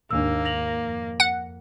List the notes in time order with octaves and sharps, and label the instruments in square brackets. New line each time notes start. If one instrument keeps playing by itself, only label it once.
[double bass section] D#2 G#2 [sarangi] A#3 [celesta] D4 E6
[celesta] A#6 F7 F#7
[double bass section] F2
[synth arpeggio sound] F#5